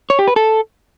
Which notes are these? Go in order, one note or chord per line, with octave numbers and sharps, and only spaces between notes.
C#5
G4
B4
A4